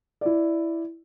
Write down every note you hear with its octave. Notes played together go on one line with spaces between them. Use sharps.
E4 D5